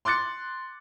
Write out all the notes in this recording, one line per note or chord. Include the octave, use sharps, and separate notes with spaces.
C6 D6 F#6 A6 C#7